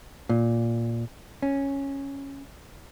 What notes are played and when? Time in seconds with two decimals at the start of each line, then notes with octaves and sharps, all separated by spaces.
0.29 A#2
1.42 C#4